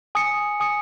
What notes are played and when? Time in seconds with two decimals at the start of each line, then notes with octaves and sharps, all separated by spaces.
0.15 G#5 D#6 C#7
0.60 G#5 D#6 C#7